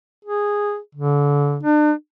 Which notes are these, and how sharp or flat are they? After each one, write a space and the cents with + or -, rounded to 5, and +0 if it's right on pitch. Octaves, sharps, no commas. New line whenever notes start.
G#4 -10
D3 -30
D4 +40